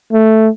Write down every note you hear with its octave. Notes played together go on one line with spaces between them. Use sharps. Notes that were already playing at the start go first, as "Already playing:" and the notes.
A3